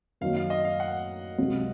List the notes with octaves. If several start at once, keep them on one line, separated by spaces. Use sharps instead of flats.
F#2 D#3 F#3 A#3 F5
F5
D#5
F5
F#5
C#2 C3 F#3